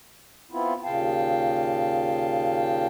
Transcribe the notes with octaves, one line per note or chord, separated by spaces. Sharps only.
B3 C4 E4 F4
D#2 A#2 C#3 F5 G5 A5